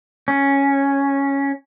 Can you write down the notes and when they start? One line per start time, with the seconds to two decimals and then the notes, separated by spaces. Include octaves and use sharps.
0.28 C#4